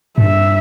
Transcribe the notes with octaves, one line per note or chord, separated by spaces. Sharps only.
G2 E5